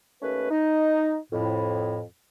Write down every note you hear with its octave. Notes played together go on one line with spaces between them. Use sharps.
D#2 A3 C#4 B4
D#4
F2 A2